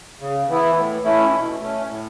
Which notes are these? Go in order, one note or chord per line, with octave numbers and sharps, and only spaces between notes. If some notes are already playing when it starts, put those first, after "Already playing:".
C#3
E3 B3 E4
A2
E3 A3 C#4 E4
B2
A3 C#4
A2